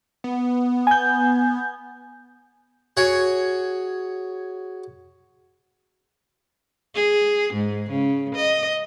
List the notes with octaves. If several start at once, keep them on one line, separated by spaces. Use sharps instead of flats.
B3
G#5 G6
F#4 G#4 C#5
G#4
G#2
C#3
D#5